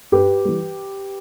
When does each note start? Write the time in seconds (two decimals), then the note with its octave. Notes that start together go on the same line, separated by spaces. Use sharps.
0.12 G2 G4 B4
0.45 E3 G3